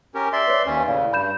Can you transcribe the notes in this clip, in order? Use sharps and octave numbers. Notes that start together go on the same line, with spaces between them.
C#4 G4 A#4
D5 E5 C6
B4 C#5
D#2 C#4 B4
A2 C#3 D5 F5
G2 B5 G6 E7